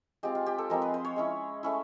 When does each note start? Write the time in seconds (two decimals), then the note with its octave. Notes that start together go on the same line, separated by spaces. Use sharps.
0.23 G#3 C4 F4 G4
0.35 F4
0.46 G4
0.58 A4
0.70 F3 G#3 C4 A#4
0.82 B4
0.94 C5
1.05 C#5
1.16 G#3 C#4 E4
1.63 A3 C#4 E4